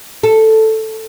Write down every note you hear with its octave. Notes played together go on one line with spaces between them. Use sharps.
A4